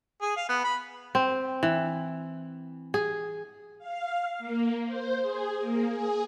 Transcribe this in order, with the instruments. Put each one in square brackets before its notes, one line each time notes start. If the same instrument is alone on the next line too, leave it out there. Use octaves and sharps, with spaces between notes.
[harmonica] G#4
F5
B3
B5
[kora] C4
E3
G#4
[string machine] F5
A#3
C5
G#4
A#3
G#4